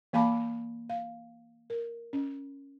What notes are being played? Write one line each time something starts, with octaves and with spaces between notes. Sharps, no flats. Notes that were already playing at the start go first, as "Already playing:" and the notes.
E3 A#3 F5 A5 B5 D6
F5
A#4
C#4